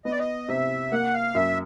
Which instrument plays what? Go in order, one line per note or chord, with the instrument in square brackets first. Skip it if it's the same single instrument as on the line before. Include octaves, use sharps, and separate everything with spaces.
[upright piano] B3 [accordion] D#5
[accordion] D5
D#5
[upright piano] C3 [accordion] E5
[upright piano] A#3 [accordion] F#5
[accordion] F5
[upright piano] F#2 [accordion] E5